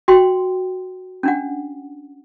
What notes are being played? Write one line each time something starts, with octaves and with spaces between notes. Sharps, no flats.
F#4 G5 C6
C#4 D4 F#5